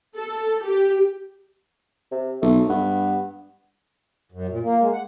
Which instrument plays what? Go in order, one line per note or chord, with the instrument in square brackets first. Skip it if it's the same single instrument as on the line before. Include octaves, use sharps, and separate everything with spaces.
[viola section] A4
G4
[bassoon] C3
[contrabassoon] B1 [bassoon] A3
[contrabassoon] G2 [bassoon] B3
[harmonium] F#2
A#2
A#3
G#3
F#5